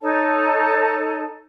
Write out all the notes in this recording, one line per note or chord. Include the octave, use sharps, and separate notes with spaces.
D#4 A4 C#5 A5